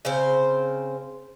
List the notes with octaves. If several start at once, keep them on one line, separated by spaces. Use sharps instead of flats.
C#3 C4 C5